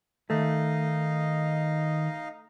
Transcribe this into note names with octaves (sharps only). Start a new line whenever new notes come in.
D#3 A3 D#4 D#5 F5